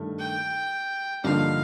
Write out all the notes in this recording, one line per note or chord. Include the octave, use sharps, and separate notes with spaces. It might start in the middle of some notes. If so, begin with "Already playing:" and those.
Already playing: G2 D#3 A3
G5
G2 D3 F3 A#3 D#4 F5